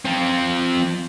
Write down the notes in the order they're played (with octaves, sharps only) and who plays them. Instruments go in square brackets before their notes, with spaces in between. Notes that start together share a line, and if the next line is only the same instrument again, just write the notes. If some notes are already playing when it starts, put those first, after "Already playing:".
[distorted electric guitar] F3 C4